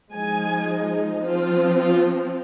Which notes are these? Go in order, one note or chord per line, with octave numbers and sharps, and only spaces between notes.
F3 G#3 D#4 G#5
F3 C4 F4
F4